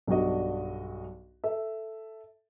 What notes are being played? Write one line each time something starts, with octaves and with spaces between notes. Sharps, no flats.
B1 G2 D4 F#4 D#5
A4 E5